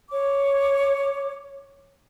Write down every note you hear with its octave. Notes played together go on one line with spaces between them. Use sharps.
C#5 D6